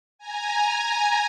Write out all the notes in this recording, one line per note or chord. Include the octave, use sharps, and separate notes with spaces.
G#5 A#5